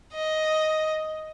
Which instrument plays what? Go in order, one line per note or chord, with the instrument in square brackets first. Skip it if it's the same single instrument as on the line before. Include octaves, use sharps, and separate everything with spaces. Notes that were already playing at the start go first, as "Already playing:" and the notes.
[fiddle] D#5